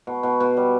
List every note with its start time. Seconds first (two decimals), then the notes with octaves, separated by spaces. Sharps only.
0.07 B2
0.23 B2
0.40 B2
0.57 G3